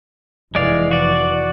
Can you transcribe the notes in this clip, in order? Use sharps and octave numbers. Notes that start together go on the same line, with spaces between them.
F1 E3 G#3 D5 F5
F#4 D5